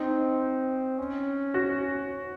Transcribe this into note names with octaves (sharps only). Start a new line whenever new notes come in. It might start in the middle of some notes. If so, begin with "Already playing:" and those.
Already playing: C4 D#4
C#4
F#4